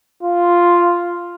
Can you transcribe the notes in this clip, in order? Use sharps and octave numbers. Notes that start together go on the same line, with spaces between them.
F4